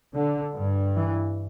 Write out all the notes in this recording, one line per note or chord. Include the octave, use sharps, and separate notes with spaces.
D3
G2
E3